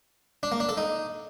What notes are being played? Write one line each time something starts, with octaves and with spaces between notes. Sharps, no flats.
D4
A#3
D4
A4
D#4